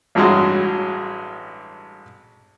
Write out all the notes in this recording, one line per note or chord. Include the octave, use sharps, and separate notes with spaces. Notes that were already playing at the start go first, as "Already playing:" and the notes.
A1 G2 F#3 G#3